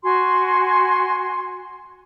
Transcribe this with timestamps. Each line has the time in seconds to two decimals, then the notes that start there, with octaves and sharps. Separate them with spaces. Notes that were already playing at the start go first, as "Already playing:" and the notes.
0.03 F#4 G#5 C6